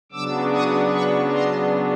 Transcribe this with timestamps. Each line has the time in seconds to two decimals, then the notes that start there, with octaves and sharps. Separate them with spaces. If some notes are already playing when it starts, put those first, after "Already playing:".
0.12 C#3 F#3 B3 D4 D6 E6
0.52 C#6 D#6
0.91 B5 C#6
1.31 A#5 C6